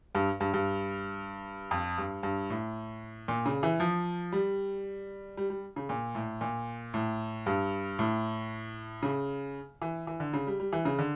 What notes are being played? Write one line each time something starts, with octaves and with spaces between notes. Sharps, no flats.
G2
G2
G2
F2
G2
G2
A2
A#2
C#3
E3
F3
G3
G3
G3
C#3
A#2
A2
A#2
A2
G2
A2
C#3
E3
E3
D3
C#3
G3
G3
E3
C#3
D3